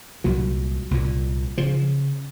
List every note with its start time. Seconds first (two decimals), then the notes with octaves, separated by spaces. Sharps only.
0.24 C2 A#2 F#3
0.91 C2 A#2
1.58 C#3 F3